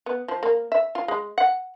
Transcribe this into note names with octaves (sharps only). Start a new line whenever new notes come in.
B3
F3
A#3
E5
F4
G#3
F#5